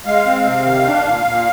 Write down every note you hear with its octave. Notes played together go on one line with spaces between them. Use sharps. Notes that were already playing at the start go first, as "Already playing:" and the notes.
G#3 F5
C4
C3
D#3
D4
A#2
A#2